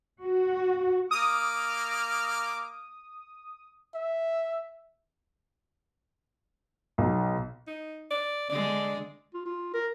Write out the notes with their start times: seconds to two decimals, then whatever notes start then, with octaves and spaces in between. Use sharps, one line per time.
0.24 F#4
1.11 A#3 D6 D#6 F6
3.94 E5
6.98 B1
7.67 D#4
8.10 D5
8.49 D3 G#3 D5
9.34 F4
9.46 F4
9.74 A#4